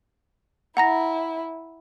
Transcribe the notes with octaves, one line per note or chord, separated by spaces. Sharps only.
E4 F#5 A#5 A#6